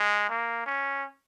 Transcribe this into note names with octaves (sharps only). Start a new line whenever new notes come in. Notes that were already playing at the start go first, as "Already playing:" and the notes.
Already playing: G#3
A#3
C#4